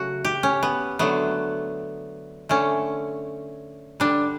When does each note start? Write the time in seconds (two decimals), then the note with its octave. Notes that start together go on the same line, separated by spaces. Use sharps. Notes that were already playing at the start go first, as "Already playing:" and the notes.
Already playing: C#3 F#3 A3 F#4
0.25 G4
0.43 C#4
0.63 B3
0.99 D3 F#3 A3 B3
2.49 D3 A3 C#4
4.00 D3 G3 D4